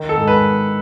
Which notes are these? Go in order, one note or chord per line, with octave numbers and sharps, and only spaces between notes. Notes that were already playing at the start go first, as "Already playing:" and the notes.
Already playing: D#3
A4
G#2
B4